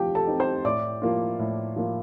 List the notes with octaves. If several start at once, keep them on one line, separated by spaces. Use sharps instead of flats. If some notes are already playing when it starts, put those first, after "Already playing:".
Already playing: F3 C4 G4 G5
A4 A5
C4 D#4
C5 C6
A2 D5 D6
F3 A#3 F4
A2
F3 A#3 F4